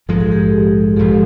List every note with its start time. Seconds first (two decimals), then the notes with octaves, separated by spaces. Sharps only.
0.08 A#1 G#2 F3 G#3 A4
0.20 G#4
0.32 G4 A4
0.96 A#1 G#2 F3 G#3 G4 A4